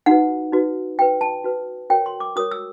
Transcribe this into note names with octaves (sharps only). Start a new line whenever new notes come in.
D#4 F#4 B4 F#5
D#4 F#4 B4
F#4 B4 G5
A5
F#4 B4
F#4 A#4 C#5 G5
C6
D6
F#4 A#4 C#5 D#6
E6